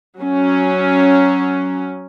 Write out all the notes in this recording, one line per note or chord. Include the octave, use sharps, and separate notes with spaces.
F#3 C#4